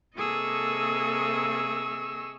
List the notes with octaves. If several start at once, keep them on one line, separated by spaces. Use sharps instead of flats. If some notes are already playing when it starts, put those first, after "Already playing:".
C3 A#3 G#4 A4 D#5 C#6 E6